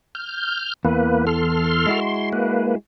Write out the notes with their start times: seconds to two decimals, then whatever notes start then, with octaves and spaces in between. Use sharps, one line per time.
0.15 F6 G6
0.85 E2 E3 A#3 B4
1.27 A4 C6 F6
1.86 G#3 E4 F#4
2.01 C6
2.33 A#3 B4